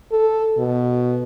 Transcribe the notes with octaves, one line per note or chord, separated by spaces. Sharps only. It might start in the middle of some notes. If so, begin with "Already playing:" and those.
A4
B2